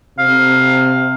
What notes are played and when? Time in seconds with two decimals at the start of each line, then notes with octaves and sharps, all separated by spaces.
0.19 C3 F5